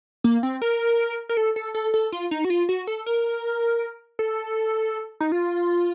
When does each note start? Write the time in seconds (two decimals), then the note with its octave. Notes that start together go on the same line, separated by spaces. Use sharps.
0.24 A#3
0.43 C4
0.62 A#4
1.29 A#4
1.37 A4
1.56 A4
1.75 A4
1.94 A4
2.12 F4
2.31 D#4
2.45 F#4
2.50 F4
2.69 F#4
2.87 A4
3.06 A#4
4.19 A4
5.20 D#4
5.32 F4